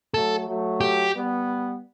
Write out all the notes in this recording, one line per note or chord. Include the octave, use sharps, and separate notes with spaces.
F#3 A3 A4
F#3 A3
G4
G3 B3